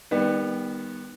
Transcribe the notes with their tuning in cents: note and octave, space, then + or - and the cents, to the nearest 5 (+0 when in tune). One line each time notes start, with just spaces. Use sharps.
D#3 +0 G3 +35 B3 +0